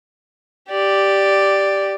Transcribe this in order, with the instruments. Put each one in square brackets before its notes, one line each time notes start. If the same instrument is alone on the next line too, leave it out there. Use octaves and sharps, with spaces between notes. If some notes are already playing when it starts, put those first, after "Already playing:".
[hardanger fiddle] G4 D5